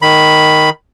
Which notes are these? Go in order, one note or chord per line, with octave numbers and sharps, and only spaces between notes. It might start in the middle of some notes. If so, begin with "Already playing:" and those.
D#3 B5